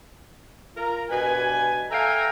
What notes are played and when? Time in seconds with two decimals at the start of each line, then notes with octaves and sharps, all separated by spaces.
0.76 F4 A#4 A#5
1.10 G2 B2 B4 G#5
1.91 A4 E5 F5 G5 G#5 A#5